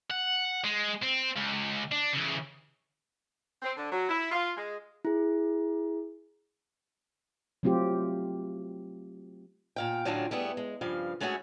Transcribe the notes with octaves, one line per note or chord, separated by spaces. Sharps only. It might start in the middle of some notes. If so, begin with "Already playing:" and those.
F#5
G#3
C4
C#2
D4
C#3 E3
C4
D3
F#3
E4
F4
G#3
E4 G#4
F#3 A3 C4 F4 G4
A#2 F5 G5
A2 D3 F#3 C#4 D4 F4
G3 A3 B3 G#4
G#3
G2 C#3 F3 F5
G#3 A3 C#4 E4 F#4 G#4